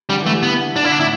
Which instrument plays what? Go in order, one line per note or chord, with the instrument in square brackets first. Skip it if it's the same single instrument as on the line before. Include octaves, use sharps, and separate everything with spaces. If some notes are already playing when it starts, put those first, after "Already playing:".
[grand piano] D3 [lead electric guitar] G3
[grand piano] E3
[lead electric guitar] A3
[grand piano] G3
[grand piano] E3 [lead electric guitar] B3
[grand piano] D3
[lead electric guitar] D4
[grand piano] D3 [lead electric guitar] E4
[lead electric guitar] D4
[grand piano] A2 [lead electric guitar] E4